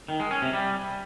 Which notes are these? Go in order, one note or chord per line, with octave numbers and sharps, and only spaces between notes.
D#3
G#3
C#4
C3
G3